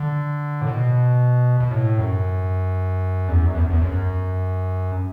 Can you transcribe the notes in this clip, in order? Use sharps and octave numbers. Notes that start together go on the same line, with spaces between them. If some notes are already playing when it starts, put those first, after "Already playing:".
Already playing: D3
A2
B2
B2
A2
F#2
E2
F#2
E2
E2
F#2